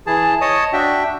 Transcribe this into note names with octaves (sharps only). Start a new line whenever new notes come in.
E3 G#4 A5
C#5 D#5 A5 D#6
D4 F#4 E5 G5